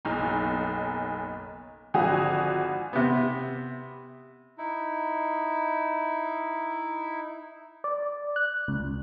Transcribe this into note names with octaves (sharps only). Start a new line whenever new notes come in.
F#1 B1 D#4
G#1 D3 F3 F#4 G#5 D#6
C3 B3
D#4 E4
D5
F#6
C#2